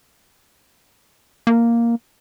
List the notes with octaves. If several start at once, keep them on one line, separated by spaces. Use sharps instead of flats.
A#3